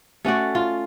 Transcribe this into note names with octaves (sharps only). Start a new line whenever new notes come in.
A3 C#4 F#4 D5
F4